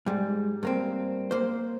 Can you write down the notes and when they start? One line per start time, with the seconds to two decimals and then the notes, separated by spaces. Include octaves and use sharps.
0.06 G#2 G3
0.63 G2 A#3 C4
1.31 A#3 C5